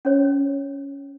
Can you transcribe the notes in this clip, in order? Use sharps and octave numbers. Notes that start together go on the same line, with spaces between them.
C#4 C#5